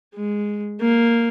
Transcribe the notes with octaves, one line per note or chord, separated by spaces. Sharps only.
G#3
A#3